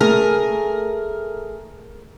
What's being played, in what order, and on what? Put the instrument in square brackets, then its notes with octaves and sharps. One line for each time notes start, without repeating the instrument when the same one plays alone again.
[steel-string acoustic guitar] A3 G#4 G#5 [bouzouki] A#4